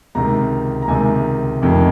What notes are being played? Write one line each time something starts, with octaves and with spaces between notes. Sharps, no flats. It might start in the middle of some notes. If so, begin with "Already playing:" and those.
C#2 C3 D#3 A#5
A#5
C#2 C3 D#3 G#5
F1 F2 C3 D#3